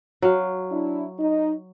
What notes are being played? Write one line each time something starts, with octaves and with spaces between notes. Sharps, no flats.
F#3 F5
D4 E4
D#4